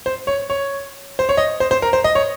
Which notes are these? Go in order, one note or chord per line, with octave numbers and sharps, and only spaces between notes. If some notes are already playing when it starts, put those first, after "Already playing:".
C5
C#5
C#5
C5
C#5
D#5
C5
C5
A#4
C5
D#5
C#5